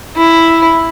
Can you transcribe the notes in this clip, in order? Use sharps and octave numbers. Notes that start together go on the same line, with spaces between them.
E4